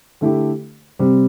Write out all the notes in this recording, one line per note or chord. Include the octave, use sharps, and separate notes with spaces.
D3 A3 E4 G4
C3 G3 C4